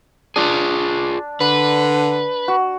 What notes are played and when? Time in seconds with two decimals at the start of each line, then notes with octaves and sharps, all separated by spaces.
0.36 D4 F4 G#4
1.40 D3 B4
2.48 F#4